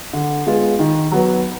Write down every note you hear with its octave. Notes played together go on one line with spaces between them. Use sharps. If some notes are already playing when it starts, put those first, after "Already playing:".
D3
G#3 B3 F4
D#3
F#3 B3